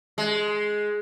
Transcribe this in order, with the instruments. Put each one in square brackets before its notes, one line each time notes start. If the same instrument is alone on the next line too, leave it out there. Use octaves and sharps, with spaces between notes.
[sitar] G#3